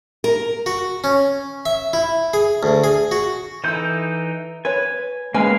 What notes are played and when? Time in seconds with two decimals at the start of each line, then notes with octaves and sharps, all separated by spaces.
0.24 A#4
0.66 F#4
1.04 C#4
1.66 E5
1.93 E4
2.34 G#4
2.63 D2
2.84 G#4
3.11 F#4
3.64 E3 D#4 E4 A4 G6
4.65 B4 C#5 G#5
5.34 G#3 A#3 C#4 A#4 B4 F5 G#5